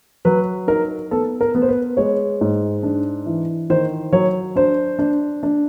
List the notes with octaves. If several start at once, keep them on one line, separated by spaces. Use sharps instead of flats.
F#3 B4
D#4 A#4
B3 A4
A#4
B3
C5
B4
G#3 C#5
G#2
D4
E3
D#3 C5
F#3 C#5
D4 C5
D4
D4